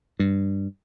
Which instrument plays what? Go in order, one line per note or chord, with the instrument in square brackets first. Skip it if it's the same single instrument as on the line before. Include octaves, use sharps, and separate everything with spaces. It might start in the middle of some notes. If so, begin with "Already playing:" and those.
[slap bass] G2